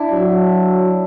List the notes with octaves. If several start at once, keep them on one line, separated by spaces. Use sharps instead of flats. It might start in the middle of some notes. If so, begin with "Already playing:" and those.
Already playing: D4 E4
F#3